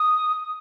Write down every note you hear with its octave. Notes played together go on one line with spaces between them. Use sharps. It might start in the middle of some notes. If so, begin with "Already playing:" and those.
Already playing: D#6